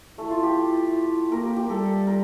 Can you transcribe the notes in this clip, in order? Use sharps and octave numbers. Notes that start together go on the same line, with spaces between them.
A3 E4
F4
G4
A#3 A#4
G4
G4
G3 A4
A#4